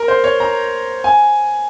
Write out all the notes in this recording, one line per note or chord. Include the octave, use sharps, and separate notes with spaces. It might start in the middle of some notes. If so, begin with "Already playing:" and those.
Already playing: A#4
C5
C#5
A#5
G#5